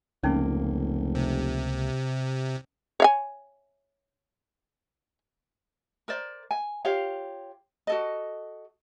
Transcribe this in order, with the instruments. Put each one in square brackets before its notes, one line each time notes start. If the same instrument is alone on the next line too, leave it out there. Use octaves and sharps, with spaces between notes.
[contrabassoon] F1 [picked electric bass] C#2 A#3 [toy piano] C#4 D#4
[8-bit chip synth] C3
[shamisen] C#5 F5 G#5
[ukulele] A#4 C5 D5
G#5
F4 G4 C#5 F5
F#4 A4 D#5